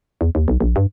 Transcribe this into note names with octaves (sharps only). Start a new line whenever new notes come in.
E2
D#2
B1
A#1
G2